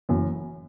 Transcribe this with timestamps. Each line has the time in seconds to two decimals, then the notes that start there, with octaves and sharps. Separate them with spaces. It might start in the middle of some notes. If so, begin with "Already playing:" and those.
0.09 F#1 F#2 E3